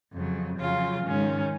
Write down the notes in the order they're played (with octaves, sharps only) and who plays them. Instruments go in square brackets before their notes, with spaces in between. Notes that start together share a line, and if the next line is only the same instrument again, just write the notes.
[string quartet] F2 C#3 F#3
F2 C#3 F#3 C#4 F4
G#2 D#3 G#3 C#4